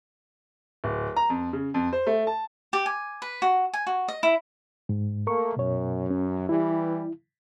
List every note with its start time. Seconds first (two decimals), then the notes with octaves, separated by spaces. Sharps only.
0.84 D1
1.16 A#5
1.30 F2
1.53 C#3
1.74 F2
1.93 C5
2.07 A3
2.27 A5
2.73 G4
2.86 G#5
3.22 B4
3.42 F#4
3.73 G#5
3.87 F#4
4.08 D#5
4.23 E4
4.89 G#2
5.27 A3 A#3 A#4 C#6
5.57 F#2 B2 C#5
6.11 C#4
6.49 E3 G3 E4